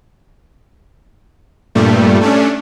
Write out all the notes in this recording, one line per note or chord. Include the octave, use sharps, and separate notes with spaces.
G2 A#2 G3 A3
A3 C#4 D4